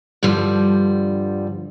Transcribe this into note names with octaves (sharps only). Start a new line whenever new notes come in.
G2 D3 F3 G3